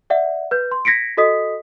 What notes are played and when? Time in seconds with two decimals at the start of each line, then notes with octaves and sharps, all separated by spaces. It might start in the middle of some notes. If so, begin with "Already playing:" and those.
0.10 D5 E5 F#5
0.51 B4 G6
0.71 C6
0.85 G#6 A#6 B6 C#7 D7
1.17 F#4 A4 D#5 D#6 B6